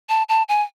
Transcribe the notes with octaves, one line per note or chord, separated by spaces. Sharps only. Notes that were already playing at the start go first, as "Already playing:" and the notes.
A5
A5
G#5